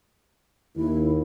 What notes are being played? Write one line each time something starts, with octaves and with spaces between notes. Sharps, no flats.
D#2 E4